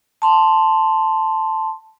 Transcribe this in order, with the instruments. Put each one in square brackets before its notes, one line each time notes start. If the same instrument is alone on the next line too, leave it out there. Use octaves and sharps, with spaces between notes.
[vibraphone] A5 C6